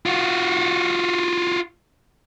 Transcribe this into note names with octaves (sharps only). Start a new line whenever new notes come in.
F4 F#4